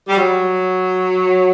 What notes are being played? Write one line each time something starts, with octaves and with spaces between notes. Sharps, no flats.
G3
F#3